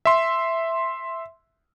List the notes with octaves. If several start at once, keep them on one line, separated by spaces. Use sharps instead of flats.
E5 C6